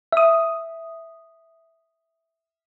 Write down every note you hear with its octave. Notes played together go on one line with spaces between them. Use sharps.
E5 D#6